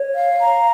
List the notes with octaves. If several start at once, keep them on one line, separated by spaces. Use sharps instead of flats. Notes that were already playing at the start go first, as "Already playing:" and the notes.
Already playing: C#5
F5
A#5